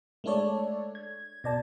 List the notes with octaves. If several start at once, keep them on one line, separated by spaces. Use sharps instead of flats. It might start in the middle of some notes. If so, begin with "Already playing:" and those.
G#3 A3 D4 A4 C#5 D5
G#6
B2 D5 A5